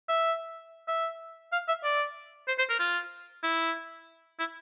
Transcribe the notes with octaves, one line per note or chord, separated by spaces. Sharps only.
E5
E5
F5
E5
D5
C5
C5
A#4
F4
E4
E4